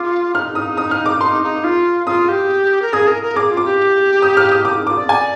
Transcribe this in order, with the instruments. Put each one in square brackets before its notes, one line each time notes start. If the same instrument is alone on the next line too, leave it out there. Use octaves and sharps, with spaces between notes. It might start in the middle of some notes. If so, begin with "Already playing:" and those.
Already playing: [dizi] F4 [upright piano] D6
[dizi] D#4 [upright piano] F6
[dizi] D#4 [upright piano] D#6
[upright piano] D#6
F6
D6
[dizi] D#4 [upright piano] C6
[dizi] D#4
F4
[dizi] F4 [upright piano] D#6
[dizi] G4
A#4
[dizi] G#4 [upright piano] D#6
[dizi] A#4
A#4
[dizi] G#4 [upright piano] D6
[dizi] F4
[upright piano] D6
[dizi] G4
[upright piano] D#6
F6
D#6
[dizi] G4 [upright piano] D6
[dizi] D#4
[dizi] F4 [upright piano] D6
[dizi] D5
[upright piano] G#5